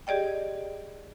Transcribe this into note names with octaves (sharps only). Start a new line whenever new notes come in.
G4 G#4 D5 D#5 G5